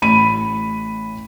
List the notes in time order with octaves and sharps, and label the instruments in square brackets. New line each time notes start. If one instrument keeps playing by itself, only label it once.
[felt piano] A1 B5 D#7